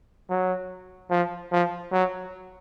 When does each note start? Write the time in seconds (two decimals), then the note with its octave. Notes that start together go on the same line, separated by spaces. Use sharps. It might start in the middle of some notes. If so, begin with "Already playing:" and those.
0.30 F#3
1.10 F3
1.51 F3
1.92 F#3